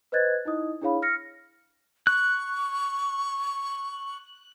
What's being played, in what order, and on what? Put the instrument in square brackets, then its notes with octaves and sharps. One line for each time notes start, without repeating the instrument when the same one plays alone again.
[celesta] B4 C5 D#5 F#6 G#6 A6
D#4 E4 D#5 D#6
D4 E4 G#4 C#5 F5 B5
F6 A#6 C#7
[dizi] C#6 [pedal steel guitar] F#6